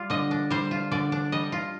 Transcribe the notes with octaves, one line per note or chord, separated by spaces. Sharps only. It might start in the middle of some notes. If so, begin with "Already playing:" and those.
Already playing: G3 F4
D3 D#5
D4
G3 C5
F4
D3 D5
D4
G3 D#5
F4